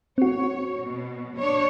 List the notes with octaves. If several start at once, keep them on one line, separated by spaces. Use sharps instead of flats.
C4 F#4 C#5
B2
D4 C#5